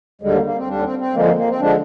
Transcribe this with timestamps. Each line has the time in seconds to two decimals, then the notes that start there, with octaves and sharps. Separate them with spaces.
0.21 D#2 D3 G3 G#3
0.33 A#3
0.45 A#3
0.56 C4
0.68 D#2 D3 G3 D4
0.83 C4
0.99 C4
1.14 F2 D3 F3 G#3 A#3
1.25 A#3
1.37 A#3
1.48 C4
1.60 D3 F3 G#3 D4